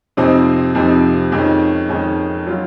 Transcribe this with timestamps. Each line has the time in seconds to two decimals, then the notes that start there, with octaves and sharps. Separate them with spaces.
0.17 F2 C3 F3 C4 D#4
0.75 F2 C3 F3 C4 D#4
1.32 F2 D#3 G#3 C#4
1.89 F2 D#3 G#3 C#4
2.47 F#3 C#4 F4